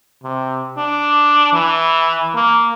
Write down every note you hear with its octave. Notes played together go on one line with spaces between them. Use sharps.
C3
D4
E3
A#3